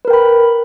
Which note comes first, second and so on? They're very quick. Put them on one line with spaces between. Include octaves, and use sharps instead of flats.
B4 A#4 G5 B5